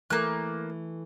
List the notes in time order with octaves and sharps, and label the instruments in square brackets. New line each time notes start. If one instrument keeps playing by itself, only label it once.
[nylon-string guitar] E3 A3 [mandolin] A#3 F#6